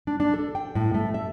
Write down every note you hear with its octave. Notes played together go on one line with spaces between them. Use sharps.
D4
D4
A4
G5
A2
A3
E5